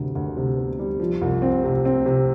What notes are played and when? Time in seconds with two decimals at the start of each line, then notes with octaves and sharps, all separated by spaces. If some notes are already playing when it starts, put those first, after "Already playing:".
Already playing: D2 C3
0.15 D2
0.37 C3
0.57 B3
0.79 G3
1.00 F3
1.21 C2
1.42 C4
1.64 C3
1.85 C4
2.06 C3